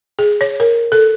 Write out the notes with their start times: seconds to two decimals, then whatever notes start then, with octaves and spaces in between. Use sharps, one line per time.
0.19 G#4
0.41 C#5
0.60 A#4
0.92 A4